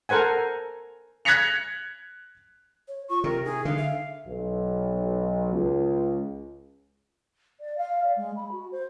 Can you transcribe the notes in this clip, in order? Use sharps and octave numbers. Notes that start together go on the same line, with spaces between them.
A4 A#4 C5 F#5 G#5
F#6 G#6 A#6 B6 C#7 F7
C#5
F4 C#6
C3 A#4
D#4 G#4
D3 F5
E5
B1
C#2
D5
F5
D5
G#3
B5
F#4
C5